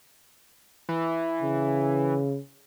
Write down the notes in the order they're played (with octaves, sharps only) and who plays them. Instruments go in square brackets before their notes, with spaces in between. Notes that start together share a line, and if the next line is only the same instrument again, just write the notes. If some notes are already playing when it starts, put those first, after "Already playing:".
[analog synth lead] E3
[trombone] C#3